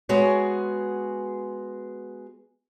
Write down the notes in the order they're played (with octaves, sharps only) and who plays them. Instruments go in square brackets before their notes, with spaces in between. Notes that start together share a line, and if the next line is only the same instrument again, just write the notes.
[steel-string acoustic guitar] G#3 B3 F#4 G#4 C#5